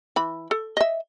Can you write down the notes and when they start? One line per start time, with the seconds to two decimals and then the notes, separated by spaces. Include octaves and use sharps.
0.16 E3 B5
0.51 A4
0.77 D#5 E5